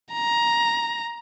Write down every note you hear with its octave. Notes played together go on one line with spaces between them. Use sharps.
A#5